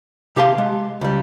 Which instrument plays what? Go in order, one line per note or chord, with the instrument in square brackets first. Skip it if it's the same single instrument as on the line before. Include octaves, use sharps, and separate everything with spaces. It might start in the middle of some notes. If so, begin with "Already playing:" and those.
[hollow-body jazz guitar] C3 G4 G#4 F5 A5 C6
G#3
C#2 G3